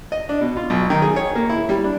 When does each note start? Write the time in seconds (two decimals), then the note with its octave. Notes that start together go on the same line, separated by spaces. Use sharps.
0.12 D#5
0.29 D4
0.41 B2
0.57 F4
0.70 B1
0.90 D#3
1.02 G#4
1.16 C#5
1.35 A#3
1.49 E4
1.69 G3
1.84 D4